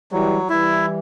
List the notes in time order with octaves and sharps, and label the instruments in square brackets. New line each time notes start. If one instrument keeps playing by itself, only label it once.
[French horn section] E3 G3 [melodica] F#3
[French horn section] E3 G3 [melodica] E4